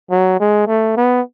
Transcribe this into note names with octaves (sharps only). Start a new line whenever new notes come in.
F#3
G#3
A3
B3